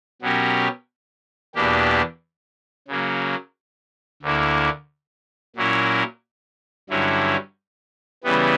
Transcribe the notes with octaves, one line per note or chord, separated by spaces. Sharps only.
B2 F#3 C#4 G4 A#4
E2 B2 A#3 D4 G4
C#3 F#3 A#3
D2 D3 A#3 E4
A#2 F#3 C#4 E4 A#4
G2 D3 F#3 C#4 E4
C#3 E3 G3 B3